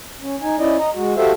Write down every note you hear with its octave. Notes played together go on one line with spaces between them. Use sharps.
C#4
D#4 G#5
C#4 E4 D5 D#5
D#5 A#5
G#3 F#4
F#4 G4 A4 C5 E5 F5